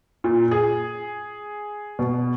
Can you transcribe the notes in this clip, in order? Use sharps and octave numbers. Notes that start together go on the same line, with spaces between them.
A#2
G#4
B2